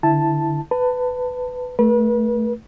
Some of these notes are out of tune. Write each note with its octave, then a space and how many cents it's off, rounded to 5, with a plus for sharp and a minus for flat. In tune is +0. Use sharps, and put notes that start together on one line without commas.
D3 +0 E4 +0 A5 +0
B4 +15 A5 +25
A3 +0 B4 -40